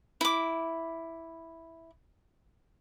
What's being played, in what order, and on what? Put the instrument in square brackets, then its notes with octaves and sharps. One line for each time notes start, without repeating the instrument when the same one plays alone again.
[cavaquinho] E4 D6